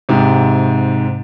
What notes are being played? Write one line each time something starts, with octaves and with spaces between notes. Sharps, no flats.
G#2 C3